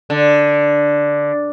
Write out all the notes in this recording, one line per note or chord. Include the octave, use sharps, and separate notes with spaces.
D3